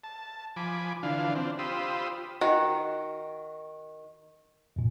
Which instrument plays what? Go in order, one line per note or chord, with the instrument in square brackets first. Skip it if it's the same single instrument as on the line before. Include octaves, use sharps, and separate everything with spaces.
[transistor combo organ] A5
F3 G#5 B5 D6
D3 E3 D4 F4 F5
C4 D4
F4 G4 C5 B5 D#6 E6
[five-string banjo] D#3 F#4
[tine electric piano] F2 A#2